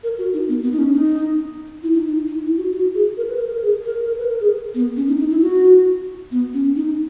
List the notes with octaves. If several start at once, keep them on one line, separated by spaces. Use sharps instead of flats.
A#4
F#4
D#4
B3
B3
D#4
C#4
D#4
E4
D#4
D#4
D#4
E4
F#4
F#4
G#4
A#4
B4
A#4
A#4
G#4
A#4
A#4
B4
A#4
G#4
B3
C#4
D#4
D#4
E4
F#4
B3
C#4
D#4